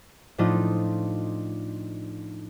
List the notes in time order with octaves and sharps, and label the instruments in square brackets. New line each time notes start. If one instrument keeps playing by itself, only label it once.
[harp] A2 F3 A3 D4 D#4 F4